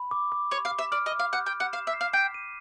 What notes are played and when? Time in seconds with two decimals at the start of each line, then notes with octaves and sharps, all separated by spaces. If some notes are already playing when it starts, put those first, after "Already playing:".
Already playing: B5
0.11 D6
0.32 D6
0.51 C#5 D6
0.65 F5
0.71 D6
0.79 E5
0.92 D5 F6
1.06 D#5
1.12 D6
1.19 F5
1.32 F#5 G6
1.46 G5
1.53 G6
1.60 F#5
1.73 F5 E7
1.87 E5
1.93 C7
2.01 F5
2.13 G5 B6
2.34 D#7